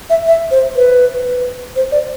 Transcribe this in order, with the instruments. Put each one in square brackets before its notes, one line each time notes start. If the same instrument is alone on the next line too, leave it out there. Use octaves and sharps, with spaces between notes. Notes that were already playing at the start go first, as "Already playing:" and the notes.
[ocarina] E5
E5
C5
B4
C5
D5